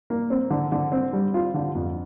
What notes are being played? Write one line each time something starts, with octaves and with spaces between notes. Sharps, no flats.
A#3
C4
D3
D3
C4
G3
F4
D3
F2